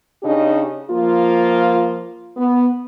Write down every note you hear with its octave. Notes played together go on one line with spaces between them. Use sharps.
C#3 D4 D#4 G4
F3 A#3 F4
B3